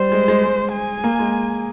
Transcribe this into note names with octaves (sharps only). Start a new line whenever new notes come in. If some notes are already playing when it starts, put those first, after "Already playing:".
Already playing: G3 C5
G#3
G#3
G#3
G#5
A#3
G#3